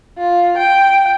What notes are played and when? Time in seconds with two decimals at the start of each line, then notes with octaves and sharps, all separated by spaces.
0.18 F4
0.57 G5